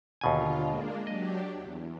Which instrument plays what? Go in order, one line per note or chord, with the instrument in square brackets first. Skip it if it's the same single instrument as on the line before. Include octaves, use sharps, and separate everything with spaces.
[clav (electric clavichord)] D#2 B2 G#5 [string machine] D3 F4
[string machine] G#3 A#3 D4
[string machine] F#3 D4 G4 [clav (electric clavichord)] D#5
[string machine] E2